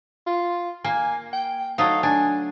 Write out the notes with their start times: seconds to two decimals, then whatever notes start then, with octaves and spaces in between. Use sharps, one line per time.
0.27 F4
0.84 A#3 G#5
1.33 G5
1.78 F#3 A3 D#4 F5
2.03 D4 G#5